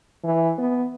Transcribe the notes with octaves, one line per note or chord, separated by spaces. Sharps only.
E3
B3